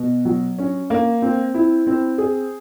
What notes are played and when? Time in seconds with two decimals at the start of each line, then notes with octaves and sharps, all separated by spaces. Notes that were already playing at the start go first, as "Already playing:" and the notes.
Already playing: B2
0.25 F#3
0.58 C#4
0.90 A#3
1.22 C4
1.54 E4
1.87 C4
2.18 G#4